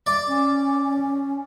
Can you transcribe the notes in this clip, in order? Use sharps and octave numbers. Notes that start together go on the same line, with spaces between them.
D5
C#4